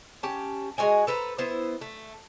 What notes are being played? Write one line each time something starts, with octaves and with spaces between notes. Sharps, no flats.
C#4 G4 A5
G#3 F#4 D#5 G#5
A4 B4 C5 A#5
B3 E4 C5
A3